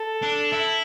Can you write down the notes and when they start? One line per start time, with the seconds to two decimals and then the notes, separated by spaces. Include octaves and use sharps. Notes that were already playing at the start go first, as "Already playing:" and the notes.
Already playing: A4
0.22 D4
0.52 E4